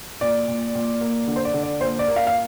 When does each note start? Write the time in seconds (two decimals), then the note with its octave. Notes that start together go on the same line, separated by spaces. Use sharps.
0.21 A#2 D5
0.48 A#2
0.75 A#2
1.01 A#3
1.27 D3
1.36 C5
1.45 D5
1.54 D3
1.63 D5
1.81 A#2 C5
1.99 D5
2.08 A#3
2.16 F5
2.27 F5